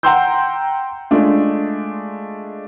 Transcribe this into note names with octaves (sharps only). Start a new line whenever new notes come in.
F#5 G5 A#5 C6 E6 G6
G#3 A3 D4 F4